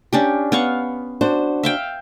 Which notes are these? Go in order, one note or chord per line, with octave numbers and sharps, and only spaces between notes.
C#4 D4 G4
B3 F5 C#6
D4 F#4 C5
E5 F5 G5